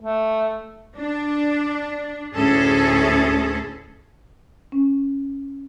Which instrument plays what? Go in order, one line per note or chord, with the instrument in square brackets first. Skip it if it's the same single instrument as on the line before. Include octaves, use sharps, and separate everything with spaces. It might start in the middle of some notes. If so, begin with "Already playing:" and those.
[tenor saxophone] A3
[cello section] D4
D2 A2 C#4 G#4 A4
[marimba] C#4